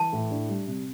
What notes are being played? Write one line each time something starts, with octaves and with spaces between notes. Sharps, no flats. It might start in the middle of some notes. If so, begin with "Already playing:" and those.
Already playing: E3 A5
A2
D4
G3
C3